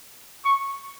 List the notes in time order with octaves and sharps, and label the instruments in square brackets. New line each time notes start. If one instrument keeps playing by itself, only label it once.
[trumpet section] C#6